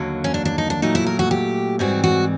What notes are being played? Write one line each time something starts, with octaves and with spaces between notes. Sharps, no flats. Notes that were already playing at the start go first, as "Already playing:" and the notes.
Already playing: D#2 D3 F#3 A#3
C#4
D4
D4
D#4
D4
A#2 F#3 A3 D#4
E4
A#4
F#4
G4
G#2 E3 G3 C4 F#4
F#4